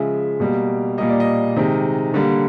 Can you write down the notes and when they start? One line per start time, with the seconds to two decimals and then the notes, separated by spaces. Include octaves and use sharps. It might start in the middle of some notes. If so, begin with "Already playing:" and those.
Already playing: C#3 F3 G#3 E5
0.40 B2 G3 A#3
0.98 A#2 G3 A#3 D#5
1.09 D5
1.20 D#5
1.56 C3 D#3 G#3
2.14 D3 G3 A#3